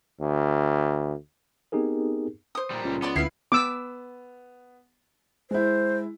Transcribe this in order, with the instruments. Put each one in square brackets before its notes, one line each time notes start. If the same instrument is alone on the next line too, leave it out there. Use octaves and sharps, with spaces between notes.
[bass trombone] D2
[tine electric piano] B3 C4 D#4 G4 G#4 A#4
[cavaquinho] C5 D#6
[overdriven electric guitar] A#2 G3
[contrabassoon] C#2
[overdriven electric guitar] B3 [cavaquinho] D5 C6 D6
[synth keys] D2 C7 [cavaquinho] E4 B4 F5
[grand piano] B3 [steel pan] D6 E6
[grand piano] G#3 E4 [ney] C5